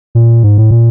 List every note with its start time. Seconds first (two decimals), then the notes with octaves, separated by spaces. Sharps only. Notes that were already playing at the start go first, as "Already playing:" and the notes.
0.15 A#2
0.43 G#2
0.58 A2
0.71 A#2